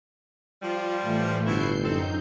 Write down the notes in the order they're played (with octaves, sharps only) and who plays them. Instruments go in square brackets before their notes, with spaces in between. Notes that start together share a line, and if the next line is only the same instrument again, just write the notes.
[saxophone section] F3 G3 [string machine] F4
[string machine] A2 E3 A3
[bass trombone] G1 [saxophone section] B2 E4 [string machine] G6 C7
[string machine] F#2 D#4 G6 [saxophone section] C4 A4